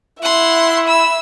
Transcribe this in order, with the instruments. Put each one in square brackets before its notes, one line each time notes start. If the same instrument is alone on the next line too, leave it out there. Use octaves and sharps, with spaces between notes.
[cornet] E4 [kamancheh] E5 [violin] F#5 C6
[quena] B5 [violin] E6